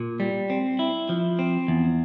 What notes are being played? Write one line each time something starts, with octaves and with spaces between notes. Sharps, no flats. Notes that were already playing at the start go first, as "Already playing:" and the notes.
Already playing: A#2
G3
C4
E4
F3
C4
E2